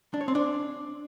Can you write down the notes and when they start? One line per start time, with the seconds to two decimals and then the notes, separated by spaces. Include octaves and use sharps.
0.14 D4
0.21 C#5
0.28 C4
0.35 D4